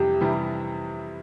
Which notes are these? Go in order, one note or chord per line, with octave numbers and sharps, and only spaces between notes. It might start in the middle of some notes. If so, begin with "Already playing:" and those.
Already playing: F2 C3 E3 G3 G4
C3 E3 G3